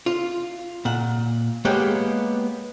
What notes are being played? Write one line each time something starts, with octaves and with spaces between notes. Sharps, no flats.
F4
A#2 F#5
G#3 A#3 B3 G4 C#5 G5